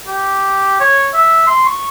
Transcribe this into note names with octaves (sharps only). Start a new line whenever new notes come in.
G4
C#5
E5
C6
C#6